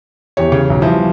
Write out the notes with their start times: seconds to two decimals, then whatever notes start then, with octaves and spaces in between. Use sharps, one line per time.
0.37 E2 G4 C#5
0.52 C#3
0.70 B1
0.82 E3 F3 G3